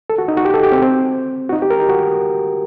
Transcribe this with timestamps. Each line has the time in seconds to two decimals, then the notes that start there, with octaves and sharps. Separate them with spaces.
0.10 A4
0.18 F#4
0.28 D#4
0.37 F#4
0.45 G4
0.54 A4
0.63 G4
0.72 C4
0.82 C4
1.49 F#4
1.53 D#4
1.62 G4
1.70 A#4
1.80 G4
1.89 F#4